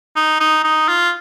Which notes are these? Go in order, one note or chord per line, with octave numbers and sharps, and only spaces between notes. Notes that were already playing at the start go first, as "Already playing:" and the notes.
D#4
D#4
D#4
F4